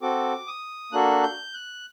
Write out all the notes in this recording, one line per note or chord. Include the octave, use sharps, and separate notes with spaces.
C4 F#4 A4 D6
D#6
A#3 D4 F#4 A4 F#6
G6
F#6